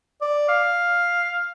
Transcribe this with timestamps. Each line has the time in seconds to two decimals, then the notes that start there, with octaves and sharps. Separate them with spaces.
0.21 D5
0.49 F5